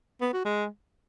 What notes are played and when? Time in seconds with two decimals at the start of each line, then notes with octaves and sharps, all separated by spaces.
0.21 B3
0.33 F#4
0.45 G#3